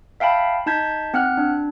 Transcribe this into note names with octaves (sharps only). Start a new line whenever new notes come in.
E5 F5 G5 A5 B5
D#4 A5 G6 G#6 B6
C4 F#5 F6 F#6
D4